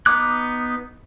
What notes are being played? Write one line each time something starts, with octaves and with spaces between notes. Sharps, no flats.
B3 D#4 D6 F#6